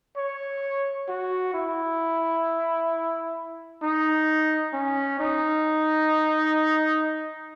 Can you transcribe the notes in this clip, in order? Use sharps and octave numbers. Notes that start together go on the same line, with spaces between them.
C#5
F#4
E4
D#4
C#4
D#4